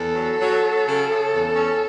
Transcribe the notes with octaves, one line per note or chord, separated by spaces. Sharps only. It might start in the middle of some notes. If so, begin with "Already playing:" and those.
Already playing: E2 A4
F#3
F#3
F#3
C#3
C#3
E2
C#4